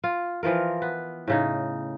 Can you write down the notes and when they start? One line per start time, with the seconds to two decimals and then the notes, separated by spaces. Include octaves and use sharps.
0.04 F4
0.43 E3 F3 F4 A#4
0.82 B3
1.28 A2 C#3 D#4